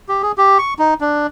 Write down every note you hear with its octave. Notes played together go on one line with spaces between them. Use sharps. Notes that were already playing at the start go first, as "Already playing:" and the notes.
G4
G#4
G4
C#6
D#4
D4